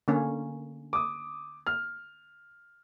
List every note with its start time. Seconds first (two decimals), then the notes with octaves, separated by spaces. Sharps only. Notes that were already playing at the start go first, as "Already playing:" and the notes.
0.08 D3 A#3 C#4
0.93 D6 D#6
1.67 F6